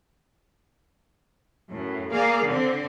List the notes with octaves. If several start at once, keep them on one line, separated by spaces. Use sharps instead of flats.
F#2 A2
A#3 G#4 D5 F5
D3 C4